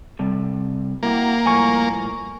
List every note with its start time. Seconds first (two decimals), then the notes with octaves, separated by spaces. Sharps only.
0.19 C3 G3 A4
1.03 A#3 E4 F#4 G4
1.46 A2 F3 G3 G#5 C#6